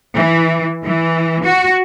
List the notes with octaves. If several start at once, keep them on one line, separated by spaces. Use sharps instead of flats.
E3
E3
F#4